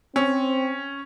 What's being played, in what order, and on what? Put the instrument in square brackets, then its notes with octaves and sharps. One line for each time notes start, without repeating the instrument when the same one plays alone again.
[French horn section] C4 [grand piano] C#4